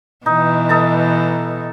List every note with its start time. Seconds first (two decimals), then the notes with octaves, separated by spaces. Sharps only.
0.26 B2 E3 D#4
0.69 D#4 A4 A#5